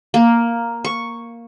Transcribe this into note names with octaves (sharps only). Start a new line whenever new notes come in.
A#3
C#6